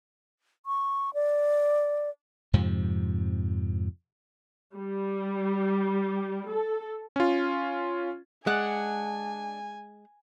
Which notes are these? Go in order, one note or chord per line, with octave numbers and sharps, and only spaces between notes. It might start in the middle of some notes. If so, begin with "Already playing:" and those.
C#6
D5
F2 G#2 C3 F3
G3
A4
C#4 F4
G#3 D4 F#5 G#5